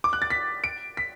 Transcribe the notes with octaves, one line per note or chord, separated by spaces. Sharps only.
D6
F#6
A6
B6
D7
B6